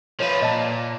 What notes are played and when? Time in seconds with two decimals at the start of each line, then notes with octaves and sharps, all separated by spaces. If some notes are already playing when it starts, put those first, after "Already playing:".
0.20 F3 B4 C#5 F5
0.42 A#2 D#5 A5